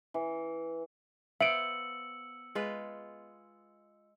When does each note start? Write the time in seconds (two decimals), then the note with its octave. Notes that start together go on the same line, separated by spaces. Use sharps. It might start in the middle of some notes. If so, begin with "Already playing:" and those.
0.14 E3
1.41 B3 C5 E5 F5 E6 C#7 D7 F#7
2.55 G#3 F4 B4